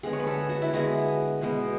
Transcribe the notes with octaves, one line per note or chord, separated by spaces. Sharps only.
D3 G#3 B3 G#4
C#5
B4
A4
F#4
E4
D3 G#3 B3 F#4
B2 G#3 B3